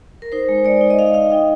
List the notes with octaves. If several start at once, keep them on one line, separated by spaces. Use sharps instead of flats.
A#4
D#4 C5
G#3
G#3 D5
D#4
D#5
D#4 F5
D#4 F5
D#4 G5